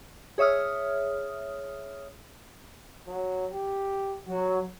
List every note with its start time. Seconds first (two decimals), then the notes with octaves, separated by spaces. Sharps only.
0.38 G#4 C#5 E5 D#6 F6
3.07 F#3
3.52 G4
4.27 F#3 F#4